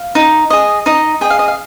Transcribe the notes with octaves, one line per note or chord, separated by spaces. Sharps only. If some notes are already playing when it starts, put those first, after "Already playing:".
Already playing: F5
D#4
G#4 D#5
D#4 D#5
G#4 D#5 G5
F5
D#5
F5